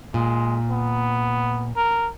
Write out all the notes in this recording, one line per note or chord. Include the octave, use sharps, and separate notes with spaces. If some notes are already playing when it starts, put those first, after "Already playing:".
A#2 G#3
B3
A#4